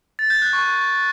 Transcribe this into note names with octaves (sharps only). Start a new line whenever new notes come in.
A6
G6
F#6
C#6